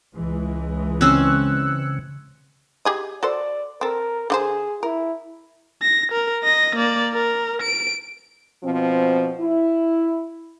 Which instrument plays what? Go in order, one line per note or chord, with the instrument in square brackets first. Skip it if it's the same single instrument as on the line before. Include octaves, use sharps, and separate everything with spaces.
[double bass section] C#2 E3 G#3
[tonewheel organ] C#3 [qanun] C4 C#4 [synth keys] E6 F#6
[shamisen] G4 G#4 D#5
[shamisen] F#4 A4 C5 [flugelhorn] D5
[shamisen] C4 A4 [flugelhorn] A#4
[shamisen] D3 F#4 C5 [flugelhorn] G#4
[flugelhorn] E4 [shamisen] A#4
[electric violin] A#6
A#4
D#5 A#6
A#3 D5
A#4
D7
[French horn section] B2 F3 C4
E4